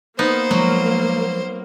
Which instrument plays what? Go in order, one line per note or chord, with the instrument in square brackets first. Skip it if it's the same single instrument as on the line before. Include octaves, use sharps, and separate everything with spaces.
[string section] A#3 [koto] B3 D#4 [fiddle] C5
[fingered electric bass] F3 G#3 [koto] F#3